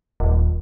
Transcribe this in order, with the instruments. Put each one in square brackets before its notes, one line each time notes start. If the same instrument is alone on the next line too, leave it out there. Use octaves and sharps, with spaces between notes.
[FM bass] D#1